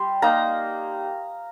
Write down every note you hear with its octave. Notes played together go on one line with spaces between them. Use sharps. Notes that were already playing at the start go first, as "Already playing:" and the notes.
Already playing: G3 C6
A#3 D#4 A#5